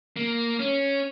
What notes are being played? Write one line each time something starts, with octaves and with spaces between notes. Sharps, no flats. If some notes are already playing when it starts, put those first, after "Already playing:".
A#3
C#4